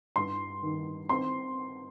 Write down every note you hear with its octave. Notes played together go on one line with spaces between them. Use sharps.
G2 C6
D#3
C4 C6